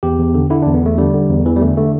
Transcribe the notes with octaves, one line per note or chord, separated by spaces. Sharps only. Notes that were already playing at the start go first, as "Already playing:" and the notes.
E2 G4
E2
D3
D3 E4
E2 D4
B3
E2 A3
D3 G3
D3
E2
E2 E3
G3
D3 A3
D3 A3